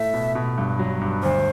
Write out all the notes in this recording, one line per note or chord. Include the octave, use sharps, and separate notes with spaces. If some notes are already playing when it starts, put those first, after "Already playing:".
Already playing: A2 A3 E5
B2
B2
G2
F#3
G2
D2 C5